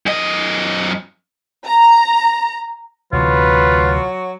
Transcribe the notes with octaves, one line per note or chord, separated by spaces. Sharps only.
F#2 D#5
A#5
D2 C3 E3 F#3 F4 B4